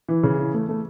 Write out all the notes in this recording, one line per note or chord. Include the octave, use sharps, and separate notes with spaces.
E3
C#3
E3
A3
A3